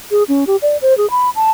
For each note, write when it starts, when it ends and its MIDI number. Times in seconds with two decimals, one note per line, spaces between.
0.11 0.23 68
0.28 0.44 61
0.47 0.56 67
0.62 0.77 74
0.82 0.96 72
0.98 1.09 68
1.11 1.30 83
1.36 1.52 81